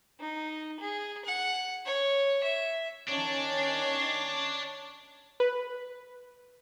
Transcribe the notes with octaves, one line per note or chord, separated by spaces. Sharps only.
D#4
G#4
F#5
C#5
E5
D#3 C#4 D4 C#5 A5
B4